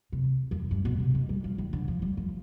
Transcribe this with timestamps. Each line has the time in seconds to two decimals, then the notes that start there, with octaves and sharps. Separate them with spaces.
0.12 C3
0.51 F2
0.71 G2
0.85 B2
1.00 C3
1.15 D#3
1.29 G3
1.44 F3
1.58 D#3
1.73 D3
1.88 F3
2.02 G3
2.17 F3